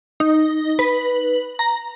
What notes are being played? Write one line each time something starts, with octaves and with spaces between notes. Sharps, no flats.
D#4
B4
A#5